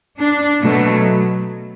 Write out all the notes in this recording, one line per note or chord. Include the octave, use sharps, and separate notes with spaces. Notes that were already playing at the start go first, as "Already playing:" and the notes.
D4
B2 F#3 A3